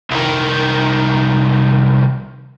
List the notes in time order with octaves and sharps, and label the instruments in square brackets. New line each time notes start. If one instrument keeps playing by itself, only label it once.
[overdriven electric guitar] C2 D#3